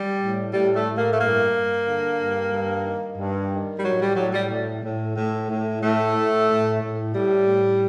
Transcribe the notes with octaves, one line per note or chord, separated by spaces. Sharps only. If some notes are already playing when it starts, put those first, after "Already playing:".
Already playing: G3
A2
A2 G3
A3
A2
A#3
A3
G2 A#3
G2
D3
G2
G2
D#3
G2
D#3
G3
A2 F#3
G3
A2 F#3
G3
A2
A2
A2
A2
A2 A3
A2
A2
A2
A2 G3
A2